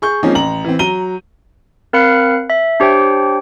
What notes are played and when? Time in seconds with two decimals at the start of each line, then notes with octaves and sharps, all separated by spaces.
0.02 G#4 C#6 G6
0.23 F3 G#3 A#3 C4 C#4 D#4
0.35 A1 A#5 F#7
0.64 E3 C4
0.79 F#3 A#5 D#7 G7
1.93 C4 A#4 F5 B5 F#6 C#7
2.50 E5
2.80 D4 G4 C5 C#5 G5